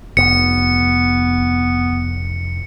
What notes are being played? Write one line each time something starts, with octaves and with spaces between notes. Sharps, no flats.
F1 B3 C#7